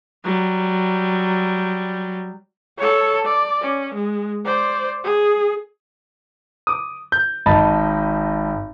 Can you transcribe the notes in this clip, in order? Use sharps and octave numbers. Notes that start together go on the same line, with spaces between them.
F#3 G3
A4 C#5
D5
C#4
G#3
C5 D5
G#4
D6 D#6
G6
G#1 D#5 A5 B5 A6